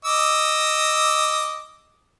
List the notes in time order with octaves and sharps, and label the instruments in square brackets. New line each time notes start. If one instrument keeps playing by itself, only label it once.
[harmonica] D#5 D6 E6